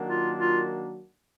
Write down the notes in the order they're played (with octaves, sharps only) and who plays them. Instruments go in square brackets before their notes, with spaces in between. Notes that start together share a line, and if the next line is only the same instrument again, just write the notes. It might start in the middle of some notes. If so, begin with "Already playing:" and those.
Already playing: [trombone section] D#3 F#3 A#3 D4 F#4
[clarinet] F4
F4